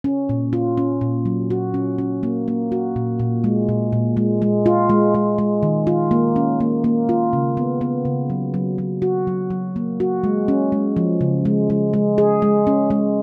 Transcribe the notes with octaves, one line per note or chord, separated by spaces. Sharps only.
C#4
A#2
F4
C#4
A#2
F#3
F#4
C#4
C#4
A#3
A#3
F#4
A#2
A#2
G#3
A#2
A#2
G#3
G#3
F4
G#3
G#3
G#3
D#3
F4
A#3
C#4
A#3
A#3
F4
C#3
B3
B3
C#3
F#3
F#3
F#3
F#4
F#3
F#3
A#3
F#4
G#3
C#4
G#3
F3
C#3
G#3
G#3
G#3
G#4
G#3
C#4
G#3